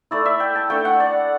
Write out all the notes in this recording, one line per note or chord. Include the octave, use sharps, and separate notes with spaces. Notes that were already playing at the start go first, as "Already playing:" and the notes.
A3 E4 D5
E5
G5
A5
A3 D4 G5
F#5
D5